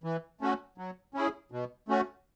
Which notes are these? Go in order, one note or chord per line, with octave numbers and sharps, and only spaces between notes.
E3
A3 C#4 F#4
F#3
C#4 E4 G#4
B2
A3 C#4 F#4